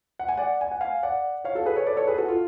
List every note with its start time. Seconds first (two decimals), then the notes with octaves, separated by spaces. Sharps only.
0.19 F#5
0.29 G#5
0.37 D5 F#5
0.61 G#5
0.72 F#5
0.81 F5 G#5
1.03 D5 F#5
1.45 C#5 F5
1.55 F#4 A4
1.66 G#4 B4
1.76 A4 C#5
1.87 B4 D5
1.97 A4 C#5
2.07 G#4 B4
2.18 F#4 A4
2.28 F4